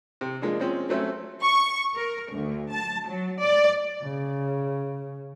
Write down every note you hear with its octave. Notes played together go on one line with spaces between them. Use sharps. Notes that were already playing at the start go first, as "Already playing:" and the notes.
C3
F3 G#3 A#3 D4
F3 G#3 C4 C#4
F#3 A3 C4 C#4 E5
C#6
A#4
D2
A5
F#3
D5
C#3